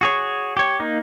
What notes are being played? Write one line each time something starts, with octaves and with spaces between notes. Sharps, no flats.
F#4 G#4 C#5
G4 C#5
A#3 D#4